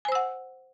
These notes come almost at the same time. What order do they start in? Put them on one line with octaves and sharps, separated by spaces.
G#5 C5 E6 F#5